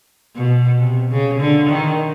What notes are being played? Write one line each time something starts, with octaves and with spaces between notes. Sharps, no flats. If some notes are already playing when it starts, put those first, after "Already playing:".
B2
C3
C#3
D3
D#3